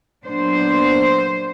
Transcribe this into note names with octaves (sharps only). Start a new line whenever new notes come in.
A#2 F#3 B3 D4 C5